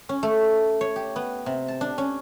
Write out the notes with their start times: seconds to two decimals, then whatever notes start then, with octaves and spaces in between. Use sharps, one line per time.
0.09 C#4
0.23 A3
0.81 C#5
0.96 G4
1.16 B3
1.46 C3
1.68 A5
1.81 D4
1.98 C#4